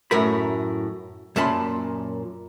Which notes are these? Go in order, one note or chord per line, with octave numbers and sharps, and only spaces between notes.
F#2 A2 A#4 B5
F#2 A#2 A5 B5 C6